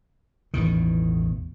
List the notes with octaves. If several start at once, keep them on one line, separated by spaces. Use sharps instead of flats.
A1 E2 B2 D#3